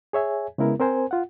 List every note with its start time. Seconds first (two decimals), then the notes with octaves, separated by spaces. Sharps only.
0.13 G#4 C#5 E5 G#5
0.58 C#3 G#3 B3 E4 A#4
0.80 C4 A#4 C5 G#5
1.11 F4 F#5